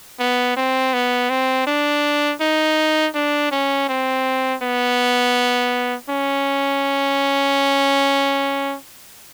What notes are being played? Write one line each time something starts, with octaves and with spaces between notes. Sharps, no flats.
B3
C4
B3
C4
D4
D#4
D4
C#4
C4
B3
C#4